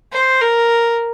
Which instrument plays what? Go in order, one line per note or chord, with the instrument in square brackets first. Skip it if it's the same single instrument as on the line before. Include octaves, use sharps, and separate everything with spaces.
[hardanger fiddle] C5
A#4